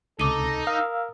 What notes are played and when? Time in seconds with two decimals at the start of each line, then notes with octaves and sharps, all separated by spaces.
0.20 C#2 C3 D#4 A4 D6 D#7
0.67 A#4 F5 D#6 E6